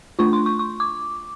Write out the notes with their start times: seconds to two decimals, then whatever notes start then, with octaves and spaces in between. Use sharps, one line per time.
0.19 A3 D4 F4 C#6
0.33 C6
0.46 C#6
0.59 C#6
0.80 D6